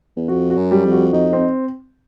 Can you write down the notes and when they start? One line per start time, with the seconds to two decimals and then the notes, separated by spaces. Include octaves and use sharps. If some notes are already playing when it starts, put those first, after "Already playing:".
0.16 E2
0.28 F2 F#4
0.50 F#4
0.57 F#2
0.71 G3
0.85 F2
0.91 F#4
1.13 F2 D#4
1.33 C4